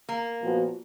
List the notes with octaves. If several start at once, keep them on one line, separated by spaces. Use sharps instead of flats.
A#3
A#2 F3 B3 F#4